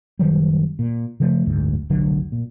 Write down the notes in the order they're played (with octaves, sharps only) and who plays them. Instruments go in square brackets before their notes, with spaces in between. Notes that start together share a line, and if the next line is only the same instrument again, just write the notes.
[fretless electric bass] F#1 D#3 F#3 G3
A#2
C#3 F3 A3
F#1 D2 G#2
F1 B1 D3 F#3
A#2